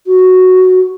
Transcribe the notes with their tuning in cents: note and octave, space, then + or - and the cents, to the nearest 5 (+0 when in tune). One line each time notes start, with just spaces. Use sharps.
F#4 +0